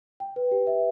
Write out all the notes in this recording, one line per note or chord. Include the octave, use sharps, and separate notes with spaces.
G5
B4
G4
E5